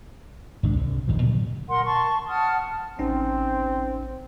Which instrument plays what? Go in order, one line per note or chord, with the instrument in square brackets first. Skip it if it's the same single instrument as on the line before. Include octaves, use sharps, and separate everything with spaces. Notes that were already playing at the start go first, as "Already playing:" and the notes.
[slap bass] G#1 C#2 C#4 D4
C2
F1 D#2 A#2 F3
A#2 D3 F#3 G3
[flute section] A#4 F#5 C6
A5 C6 C#6
F#5 A5 D#6 F6
[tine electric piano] A1 C#4 D#4 [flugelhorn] C4